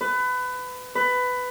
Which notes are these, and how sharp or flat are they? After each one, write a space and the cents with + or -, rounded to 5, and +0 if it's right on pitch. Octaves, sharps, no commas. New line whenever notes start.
B4 +25
B4 +15